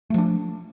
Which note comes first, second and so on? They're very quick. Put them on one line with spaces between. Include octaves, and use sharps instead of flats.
A3 F3 D4